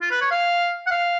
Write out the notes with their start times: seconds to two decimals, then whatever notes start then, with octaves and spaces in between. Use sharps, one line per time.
0.01 F4
0.11 B4
0.21 C#5
0.31 F5
0.87 F#5
0.91 F5